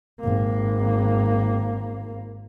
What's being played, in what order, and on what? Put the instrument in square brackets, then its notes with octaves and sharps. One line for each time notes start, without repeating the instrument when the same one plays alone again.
[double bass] G#1 A#3